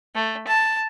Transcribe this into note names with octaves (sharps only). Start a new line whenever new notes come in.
A3
A5